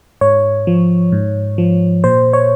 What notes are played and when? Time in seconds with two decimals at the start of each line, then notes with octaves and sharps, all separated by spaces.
0.21 G#2 C#5
0.67 F3
1.12 G#2
1.58 F3
2.04 A#2 C5
2.33 C#5